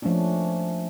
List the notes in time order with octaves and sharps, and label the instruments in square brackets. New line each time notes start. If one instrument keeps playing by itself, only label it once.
[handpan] F3 A3 A#3 C#4 D4